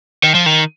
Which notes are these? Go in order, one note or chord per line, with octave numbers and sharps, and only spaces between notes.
D#3
F3
D#3